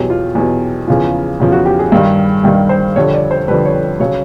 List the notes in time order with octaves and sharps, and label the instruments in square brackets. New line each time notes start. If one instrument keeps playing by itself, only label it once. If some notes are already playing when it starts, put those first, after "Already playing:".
Already playing: [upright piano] E2 B2 F#3 G4
F4
E2 B2 F#3
E2 C#3 F3
E2 C#3 F3
F#4
G4
G#4
G2 D#3 G3
G2 D#3 G3
C5
F2 D3 G3 C#5
D5
C5
F2 D3 G3 B4
C#5
C#3 F#3 C#5